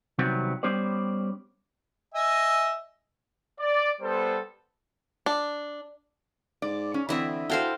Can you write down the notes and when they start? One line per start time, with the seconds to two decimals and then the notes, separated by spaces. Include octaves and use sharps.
0.19 C3 D#3 F#3 G3 B3 C4
0.63 G3 B3 C#4 G4 C5 D5
2.14 D#5 E5 G#5
3.60 D5
4.01 G3 B3 A4 C5
5.26 D4
6.62 G#2 D5
6.94 C#4
7.09 D3 E3 C4 E4 D#5 E5
7.50 E4 F#4 A4 C5 F5 G5